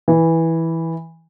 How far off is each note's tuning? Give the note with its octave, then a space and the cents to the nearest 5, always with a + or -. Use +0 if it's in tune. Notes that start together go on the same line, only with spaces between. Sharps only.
E3 -10